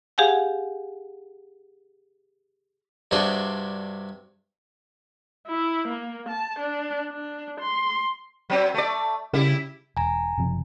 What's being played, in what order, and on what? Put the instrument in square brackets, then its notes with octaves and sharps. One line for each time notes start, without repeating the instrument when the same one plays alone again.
[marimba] G4 G#4 F5 F#5 G#5
[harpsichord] G2 C3 D4 F#4 G#4 C6
[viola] E4
A#3
A5
D4
D4
C6
[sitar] F#3 C4
A3 D5
[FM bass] C#3 [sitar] G3 E4
[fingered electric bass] E1 [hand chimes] G#5 A#5
[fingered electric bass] F#1 C3 F3